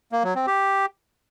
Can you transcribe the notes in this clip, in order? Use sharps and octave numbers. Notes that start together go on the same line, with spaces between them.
A#3
F#3
C4
G4